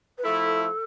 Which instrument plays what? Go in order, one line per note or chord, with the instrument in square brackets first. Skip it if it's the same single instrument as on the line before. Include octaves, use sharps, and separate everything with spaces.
[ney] B4
[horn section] F3 A3 E4 [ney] A4